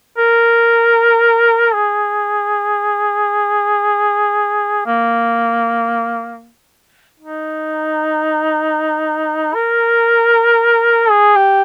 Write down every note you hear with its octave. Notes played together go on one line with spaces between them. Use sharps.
A#4
G#4
A#3
D#4
A#4
G#4
G4